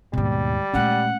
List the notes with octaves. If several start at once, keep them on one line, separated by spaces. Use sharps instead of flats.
D#2 G#2 B2 G3
A#2 G#3 A3 C#4 F#5